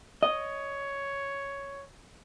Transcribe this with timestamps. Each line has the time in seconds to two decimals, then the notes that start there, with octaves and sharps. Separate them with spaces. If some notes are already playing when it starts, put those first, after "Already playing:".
0.23 C#5 D#5